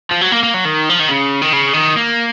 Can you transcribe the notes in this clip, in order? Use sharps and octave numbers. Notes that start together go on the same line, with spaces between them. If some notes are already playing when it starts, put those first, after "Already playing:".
F3
F#3
A#3
A#3
F#3
D#3
F3
D#3
C#3
D#3
C#3
D#3
A#3